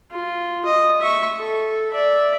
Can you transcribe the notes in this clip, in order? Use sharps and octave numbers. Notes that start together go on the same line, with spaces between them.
F4
D#5
E5 C#6
A4
D5 E5